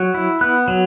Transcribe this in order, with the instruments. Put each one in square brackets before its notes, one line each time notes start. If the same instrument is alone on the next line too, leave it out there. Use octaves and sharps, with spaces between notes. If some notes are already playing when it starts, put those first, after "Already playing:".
Already playing: [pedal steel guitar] F#3 [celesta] F#6
[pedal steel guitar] E4
[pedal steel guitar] B3 [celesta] F#6
[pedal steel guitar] F#3